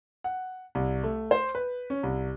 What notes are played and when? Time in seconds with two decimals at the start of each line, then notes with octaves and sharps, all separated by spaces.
0.24 F#5
0.75 C2
1.03 A3
1.31 C5
1.55 B4
1.90 C#4
2.03 C2